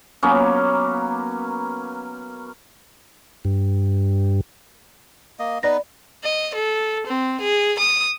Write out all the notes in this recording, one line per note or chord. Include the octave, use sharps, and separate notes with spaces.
F#3 A#3 B3 C#4
G2
A#3 D#5
B3 D#4 B4 D5 B5 A#6
D#5
A4
C4
G#4
D#6